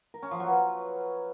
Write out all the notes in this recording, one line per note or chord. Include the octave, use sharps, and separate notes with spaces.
A#4
C#4
F3
F#3
B4